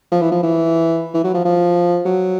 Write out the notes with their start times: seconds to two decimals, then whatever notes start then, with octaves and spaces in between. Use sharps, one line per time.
0.12 F3
0.22 E3
0.32 F3
0.43 E3
1.14 E3
1.24 F#3
1.34 F3
1.45 F3
2.05 F#3